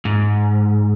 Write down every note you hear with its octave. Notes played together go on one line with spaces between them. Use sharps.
G#2